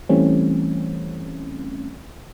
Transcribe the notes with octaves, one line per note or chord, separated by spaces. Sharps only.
E3 G3 A3 C4 C#4